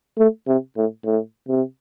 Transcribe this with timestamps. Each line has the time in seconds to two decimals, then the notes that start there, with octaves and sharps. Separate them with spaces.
0.18 A3
0.47 C3
0.76 A2
1.04 A2
1.48 C3